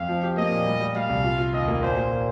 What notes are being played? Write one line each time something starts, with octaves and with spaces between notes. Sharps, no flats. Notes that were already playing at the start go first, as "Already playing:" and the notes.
Already playing: F2 F5
F3
G4
A#3 D#5
A#2
G3
G3
G3 F5
C2
F4
F4
D#2 D#5
A#3
A#2 C5
A#3
A#2